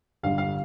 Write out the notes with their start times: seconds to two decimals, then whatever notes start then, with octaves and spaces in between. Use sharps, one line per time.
0.23 G1 G2 D3 G3 F5
0.38 F5